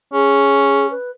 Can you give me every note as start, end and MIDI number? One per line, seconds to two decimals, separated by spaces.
0.13 0.93 61
0.13 0.87 68
0.91 1.11 71